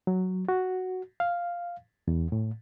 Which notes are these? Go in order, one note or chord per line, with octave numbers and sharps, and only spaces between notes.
F#3
F#4
F5
E2
A2